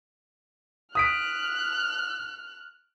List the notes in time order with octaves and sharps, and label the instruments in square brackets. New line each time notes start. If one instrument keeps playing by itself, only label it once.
[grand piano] D#6 B6 D7 [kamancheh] F6 F#6